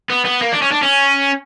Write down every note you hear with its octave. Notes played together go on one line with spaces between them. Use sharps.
B3
B3
A#3
D4
C#4
D4
C#4